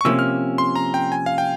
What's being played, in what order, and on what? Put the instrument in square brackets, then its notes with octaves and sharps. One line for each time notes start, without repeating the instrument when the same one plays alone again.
[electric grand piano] C#6
[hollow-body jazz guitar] C3 F3 A#3 C#4 [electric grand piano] E6
[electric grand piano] F6
C6
A#5
G5
G#5
F5
G5